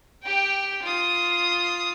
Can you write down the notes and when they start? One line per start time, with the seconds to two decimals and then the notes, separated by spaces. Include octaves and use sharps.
0.23 G4 G5
0.82 F4 D#6